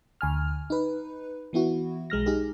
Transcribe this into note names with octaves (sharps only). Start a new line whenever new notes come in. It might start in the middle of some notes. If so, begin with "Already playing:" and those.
D2 G#5 F6
D#4 B4
E3 B3 E4 F#4
B1 G#3 F6 A#6
D#4 G4 G#4